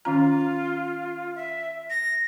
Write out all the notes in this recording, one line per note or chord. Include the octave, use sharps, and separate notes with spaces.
D#3 C#4 F4 A#5
E5
A#6